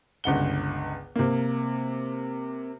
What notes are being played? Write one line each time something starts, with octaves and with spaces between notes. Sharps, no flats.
G1 C#2 F#5 G7
C3 A#3